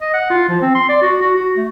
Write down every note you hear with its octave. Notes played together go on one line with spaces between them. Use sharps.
D#5
F#5
F4
F3
C4
C6
D5
F#4
F#4
F#4
A3